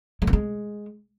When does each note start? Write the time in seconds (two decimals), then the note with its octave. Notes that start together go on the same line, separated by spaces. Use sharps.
0.22 G#3
0.27 A#3
0.33 G#3